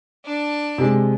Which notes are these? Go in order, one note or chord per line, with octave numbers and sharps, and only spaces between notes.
D4 A5
C3 G#3